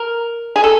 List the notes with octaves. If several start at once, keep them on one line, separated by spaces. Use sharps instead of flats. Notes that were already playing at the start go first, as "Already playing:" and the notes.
Already playing: A#4
G#4
A4